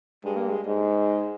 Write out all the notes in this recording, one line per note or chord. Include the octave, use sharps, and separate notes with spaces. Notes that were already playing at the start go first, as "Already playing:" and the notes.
G2 G#3
A#3
G#3
G#2 G#3